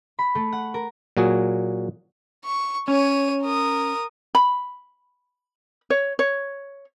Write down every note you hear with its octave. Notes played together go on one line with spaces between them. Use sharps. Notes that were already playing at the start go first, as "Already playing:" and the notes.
B5
A3
F#5
A#4
A#2 F#3 F#4 G#4
C#6
C#4 C#5 D#7
A#4 D#6
B5
C#5
C#5